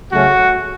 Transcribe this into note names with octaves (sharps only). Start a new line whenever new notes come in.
C#3 F#3 A3 C#4 F#4